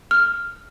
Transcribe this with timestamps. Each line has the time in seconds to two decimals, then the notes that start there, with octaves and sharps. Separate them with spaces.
0.11 F6